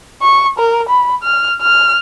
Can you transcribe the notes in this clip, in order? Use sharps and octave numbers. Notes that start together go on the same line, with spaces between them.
C#6
A#4
B5
F6
F6